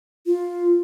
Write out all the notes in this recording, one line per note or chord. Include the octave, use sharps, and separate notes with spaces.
F4